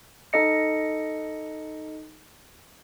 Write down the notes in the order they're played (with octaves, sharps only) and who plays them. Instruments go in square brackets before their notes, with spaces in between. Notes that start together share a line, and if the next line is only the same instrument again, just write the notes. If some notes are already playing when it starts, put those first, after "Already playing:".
[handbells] D#4 A4 D#5 C#7